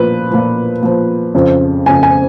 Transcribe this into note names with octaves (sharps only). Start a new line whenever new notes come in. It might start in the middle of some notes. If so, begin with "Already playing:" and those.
Already playing: A#2 F3 B4
A#2 F3
A#2 F3
F2 C#3 F3
F2 C#3 F3 G#5
G#5